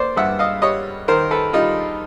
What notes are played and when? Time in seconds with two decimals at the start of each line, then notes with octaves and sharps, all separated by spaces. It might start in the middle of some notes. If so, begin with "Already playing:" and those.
Already playing: A#3 C5 D5
0.17 G2 E5 F#5
0.39 D#5 F5
0.62 G3 C#5 D#5
1.08 D#3 A#4 C5
1.31 A4 B4
1.53 G3 D#4 F4